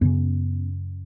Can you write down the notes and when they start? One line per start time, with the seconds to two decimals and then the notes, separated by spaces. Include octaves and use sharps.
0.01 F#2 C#3 B3